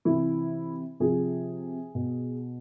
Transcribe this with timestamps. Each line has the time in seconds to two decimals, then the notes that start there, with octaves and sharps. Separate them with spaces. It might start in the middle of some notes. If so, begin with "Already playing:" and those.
0.05 C3 E3 E4
1.00 C3 F3 G#4
1.95 B2